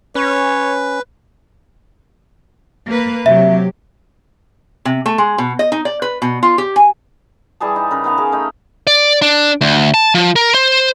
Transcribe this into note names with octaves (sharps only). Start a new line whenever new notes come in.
C#4 B4 C#5
A#3 B4
C3 F#3 G4 E5
C3
A3
G#3
B2
D#5
D#4
D5
B4
B2
F4
G4
G#5
E3 G3 G#4 A5
D#4
C#3 A#4 B4
D#3 B3 F5 A5
C#4 G#4 A#4
A3 D#4 B5
D5
D4
D2
A5
F3
A#4
C5